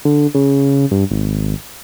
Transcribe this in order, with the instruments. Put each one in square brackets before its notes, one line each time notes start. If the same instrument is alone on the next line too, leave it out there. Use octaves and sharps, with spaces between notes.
[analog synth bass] D3
C#3
G2
G#1